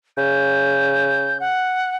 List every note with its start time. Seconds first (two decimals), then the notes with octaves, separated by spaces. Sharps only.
0.17 C#3 G6
1.40 F#5